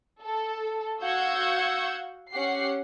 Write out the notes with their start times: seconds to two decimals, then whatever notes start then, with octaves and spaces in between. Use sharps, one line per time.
0.22 A4
1.02 F#4 F5 F#5 E6 G6 G#6
2.32 C#4 G4 F#5 C7